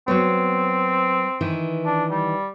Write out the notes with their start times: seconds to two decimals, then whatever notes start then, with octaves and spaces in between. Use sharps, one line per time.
0.08 F#3 B3 C4 C#5
1.41 D#3 E3
1.86 D4
2.11 G3